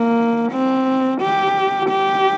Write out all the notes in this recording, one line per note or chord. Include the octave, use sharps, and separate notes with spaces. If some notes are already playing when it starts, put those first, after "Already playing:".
Already playing: A#3
C4
G4
G4